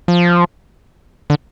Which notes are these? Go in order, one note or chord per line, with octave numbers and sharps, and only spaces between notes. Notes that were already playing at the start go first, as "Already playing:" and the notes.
F3
D3